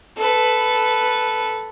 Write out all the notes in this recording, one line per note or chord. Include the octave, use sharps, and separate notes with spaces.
A4 B4